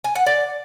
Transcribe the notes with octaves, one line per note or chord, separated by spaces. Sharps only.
G#5
F#5
D5